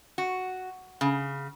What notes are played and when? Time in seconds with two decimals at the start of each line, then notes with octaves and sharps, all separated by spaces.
0.18 F#4
1.01 C#3